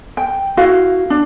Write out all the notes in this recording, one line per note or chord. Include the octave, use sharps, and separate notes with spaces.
G5
E4 F#4 F5
D4